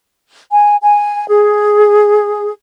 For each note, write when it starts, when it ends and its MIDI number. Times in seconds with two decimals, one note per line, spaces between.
0.52 0.74 80
0.81 1.28 80
1.29 2.52 68